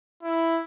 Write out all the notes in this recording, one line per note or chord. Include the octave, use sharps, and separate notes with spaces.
E4